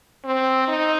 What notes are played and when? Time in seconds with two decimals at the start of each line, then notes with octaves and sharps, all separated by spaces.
0.25 C4
0.68 D#4